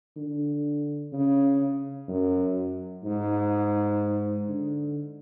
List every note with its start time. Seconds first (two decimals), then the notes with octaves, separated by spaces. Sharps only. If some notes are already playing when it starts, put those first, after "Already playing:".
0.16 D3
1.13 C#3
2.08 F#2
3.04 G#2
4.48 D3